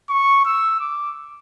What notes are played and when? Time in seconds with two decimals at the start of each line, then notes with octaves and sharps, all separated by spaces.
0.09 C#6
0.45 E6
0.80 D6